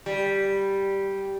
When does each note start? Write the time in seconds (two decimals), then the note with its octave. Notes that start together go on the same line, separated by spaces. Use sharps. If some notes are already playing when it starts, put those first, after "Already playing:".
0.06 G3